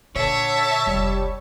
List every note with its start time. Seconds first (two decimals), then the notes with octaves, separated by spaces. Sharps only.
0.16 A#2 D3 C#5 E5 A5
0.87 F1 C#2 G3